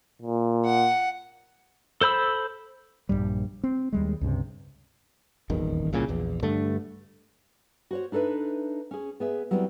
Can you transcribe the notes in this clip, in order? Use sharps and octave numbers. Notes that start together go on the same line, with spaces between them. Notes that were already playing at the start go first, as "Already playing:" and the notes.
A#2
F#5
A4 C5 B5 E6
A#1 E2 G2 G3
C4
D#2 G3 G#3
C#2 G2 C3
D#1 G#1 E2 D#3
C2 A#2 C#3
A#1 E2
G2 D3 A3
F#4 C5 C#5
D4 D#4 A4 B4 E5
C#4 G#4
B3 G#4 E5
F#3 G3 B3 C4 E4